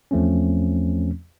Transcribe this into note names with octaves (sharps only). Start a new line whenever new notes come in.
E2 F3 A3 C4 C#4